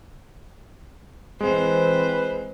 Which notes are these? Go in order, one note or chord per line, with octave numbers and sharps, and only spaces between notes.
E3 G#3 C4 B4 C5